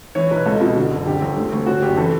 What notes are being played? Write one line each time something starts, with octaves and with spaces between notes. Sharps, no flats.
E3 C#5
B1 B4
C#2 A4
B2
D3
F#1
D3 G4
G1
D2
D2
C#3 F#4
F#1 G4
E3 A4